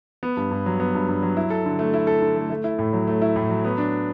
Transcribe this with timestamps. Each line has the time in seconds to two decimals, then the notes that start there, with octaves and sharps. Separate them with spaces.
0.23 B3
0.37 G2
0.51 G2
0.66 F#3
0.80 B3
0.95 G2
1.08 G2
1.22 F#3
1.37 E4
1.50 A4
1.65 D3
1.79 A3
1.94 E4
2.07 A4
2.22 D3
2.36 A3
2.50 A3
2.64 E4
2.79 A2
2.93 F#3
3.07 A3
3.22 E4
3.36 A2
3.50 F#3
3.64 B3
3.78 D4